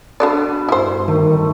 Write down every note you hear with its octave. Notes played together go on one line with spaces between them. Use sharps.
B2 D4 A4 B4 D5
G2 E4 C5
D#3 A3